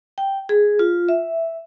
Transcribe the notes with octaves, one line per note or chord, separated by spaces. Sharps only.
G5
G#4
F4
E5